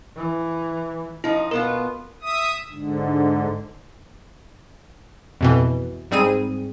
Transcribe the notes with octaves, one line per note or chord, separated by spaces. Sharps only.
E3
F3 D#4 E4
B2 B3 F4 A#4
E5 D#6
G#2 D3
F2 B2 E3
G#2 G3 C4 G#4 D#7